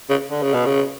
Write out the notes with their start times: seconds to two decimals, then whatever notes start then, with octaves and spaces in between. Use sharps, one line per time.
0.10 C#3
0.31 D3
0.43 C#3
0.54 B2
0.66 C#3